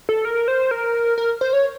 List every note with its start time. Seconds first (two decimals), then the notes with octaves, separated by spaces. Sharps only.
0.09 A4
0.25 A#4
0.48 C5
0.71 A#4
1.18 A#4
1.41 C5
1.53 C#5